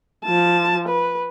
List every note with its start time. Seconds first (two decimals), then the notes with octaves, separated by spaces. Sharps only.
0.24 F3 A5
0.88 B4